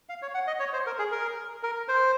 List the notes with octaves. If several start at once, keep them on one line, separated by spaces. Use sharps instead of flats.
F5
C#5
F#5
D#5
C#5
C5
A#4
G#4
A#4
A#4
C5